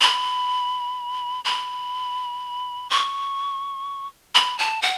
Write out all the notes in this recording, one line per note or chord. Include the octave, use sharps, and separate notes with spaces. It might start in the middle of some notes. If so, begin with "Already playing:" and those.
B5
B5
C#6
B5
A5
F#5